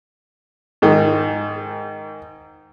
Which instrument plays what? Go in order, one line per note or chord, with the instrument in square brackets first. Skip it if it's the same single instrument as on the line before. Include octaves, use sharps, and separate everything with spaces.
[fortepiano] G#2 D#3